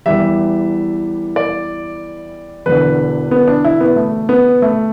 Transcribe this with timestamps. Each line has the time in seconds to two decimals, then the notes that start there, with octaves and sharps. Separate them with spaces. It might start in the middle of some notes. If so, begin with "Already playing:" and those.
0.06 E2 E3 G3 E5
1.36 D5
2.66 E1 E2 D3 B4
3.31 B3
3.48 D4
3.65 E4
3.80 B3
3.96 A3
4.29 B3
4.62 A3